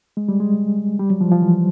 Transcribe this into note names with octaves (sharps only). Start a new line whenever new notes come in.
G#3
G3
G#3
G3
F#3
F3
F3
E3